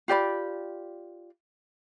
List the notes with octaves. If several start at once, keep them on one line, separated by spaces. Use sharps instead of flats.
F4 G4 D5 B5